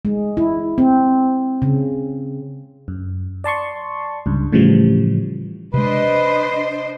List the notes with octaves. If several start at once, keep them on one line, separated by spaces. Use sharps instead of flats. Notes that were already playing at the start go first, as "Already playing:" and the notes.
G#3
E4
C4
C#3
F#2
D5 A5 C6 C#6
C#2 G2
A2 C#3 E3 F3 G3
C3 G#3 D4 B4 C5 D#5